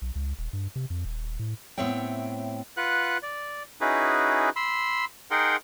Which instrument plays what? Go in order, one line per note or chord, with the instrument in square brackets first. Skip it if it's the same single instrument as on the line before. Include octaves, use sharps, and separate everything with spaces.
[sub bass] B1
C#2
D#1
G2
C3
F2
D#1
A2
[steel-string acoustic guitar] A2 B3 C4 C#5 E5 G5
[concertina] F4 B4 F#5 F#6
D5
C#4 D#4 E4 F#4 G#4 B4
B5 C6 E6
D#4 G#4 A#4 F#5 G5 C6